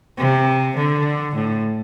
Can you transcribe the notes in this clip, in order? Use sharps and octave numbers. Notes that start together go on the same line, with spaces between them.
C3
D3
A2